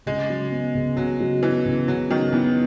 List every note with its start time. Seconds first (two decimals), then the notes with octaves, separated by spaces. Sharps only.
0.06 C#3 G#3
0.29 F#3
0.51 B3
0.75 C#3
0.97 C#3 F#3
1.20 F#3
1.42 E3 B3
1.66 C#3
1.88 C#3 F#3
2.10 D#3 F#3
2.33 E3 B3